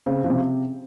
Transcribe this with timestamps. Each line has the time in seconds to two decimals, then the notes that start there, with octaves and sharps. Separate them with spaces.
0.06 C#3 C4
0.24 C#3 F3
0.30 C3